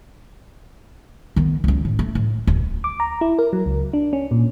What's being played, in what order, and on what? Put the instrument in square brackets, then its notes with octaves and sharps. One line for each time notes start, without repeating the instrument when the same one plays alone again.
[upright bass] D#3 B3
C#2 F#2
A2
A3
A2
D1
[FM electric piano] D6
A#5
E4
A#4
F#3
C#2
D4
C#4
A#2